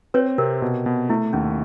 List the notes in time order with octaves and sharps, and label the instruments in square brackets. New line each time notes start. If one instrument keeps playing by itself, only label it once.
[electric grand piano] C4 [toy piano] B4 C#5
[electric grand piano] C3 [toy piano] A#4
[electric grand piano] B2
B2
[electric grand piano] A3 [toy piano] E4
[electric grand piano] D#2 [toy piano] C#4